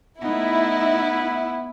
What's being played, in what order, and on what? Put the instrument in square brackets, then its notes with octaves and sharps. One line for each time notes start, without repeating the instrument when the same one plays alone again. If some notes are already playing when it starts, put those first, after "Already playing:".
[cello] A3 D#4 [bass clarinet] B3 [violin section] E4